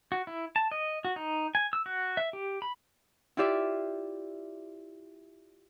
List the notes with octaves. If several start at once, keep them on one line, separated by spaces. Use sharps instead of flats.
F#4
E4
A5
D#5
F#4
D#4
G#5
E6
F#4
E5
G4
B5
E4 F4 G4 D5 E5